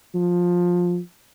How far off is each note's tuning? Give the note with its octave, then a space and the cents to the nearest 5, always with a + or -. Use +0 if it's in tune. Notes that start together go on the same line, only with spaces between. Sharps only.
F3 +15